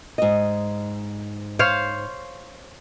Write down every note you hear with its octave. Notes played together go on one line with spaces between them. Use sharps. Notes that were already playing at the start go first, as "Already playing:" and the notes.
G#2 D#5
C5 C#5 F5